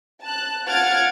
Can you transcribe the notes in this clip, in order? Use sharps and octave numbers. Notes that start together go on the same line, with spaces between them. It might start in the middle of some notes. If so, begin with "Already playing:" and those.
A5 F#6
F4 F#5 F6 G#6 A6 D7